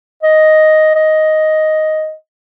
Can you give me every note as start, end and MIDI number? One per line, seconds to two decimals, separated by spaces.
0.23 0.93 75
0.95 2.14 75